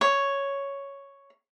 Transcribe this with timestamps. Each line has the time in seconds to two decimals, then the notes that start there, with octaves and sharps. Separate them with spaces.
0.01 C#5